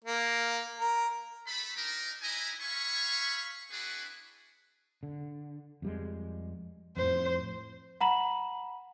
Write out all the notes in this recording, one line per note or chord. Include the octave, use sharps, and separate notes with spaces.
A#3
A#4
A3 B5
D4 D#4 A#4
D#4 E4 B4 D#5 G#5 A#5
C#5 E5 F5 G#5 B5 C#6
C4 D4 E4 F#4 G#4 B4
D3
F2 G3 G#3
F2 A2 C5
F#5 A#5 B5 F#7